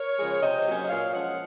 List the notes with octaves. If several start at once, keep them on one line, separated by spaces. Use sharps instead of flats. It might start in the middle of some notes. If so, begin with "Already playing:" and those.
Already playing: A#4 C#5
C#3 F3 G#3
C3 C5 D#5
F#3 A#3 C#4
D#5
A#2 C#5 F5
F3 G#3 C#4 D#5 F#5